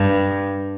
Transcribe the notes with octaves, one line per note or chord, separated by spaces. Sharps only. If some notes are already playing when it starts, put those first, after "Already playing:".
Already playing: G2